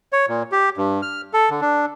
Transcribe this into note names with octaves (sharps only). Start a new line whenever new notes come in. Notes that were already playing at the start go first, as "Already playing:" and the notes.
C#5
A#2
G4
G2
F6
A4
D3
D4